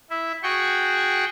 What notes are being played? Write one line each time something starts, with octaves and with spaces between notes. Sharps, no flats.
E4 E5
F#4 G#4 G5 C#6